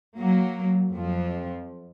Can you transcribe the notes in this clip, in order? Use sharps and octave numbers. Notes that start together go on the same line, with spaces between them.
F#3 A#3
F2 F3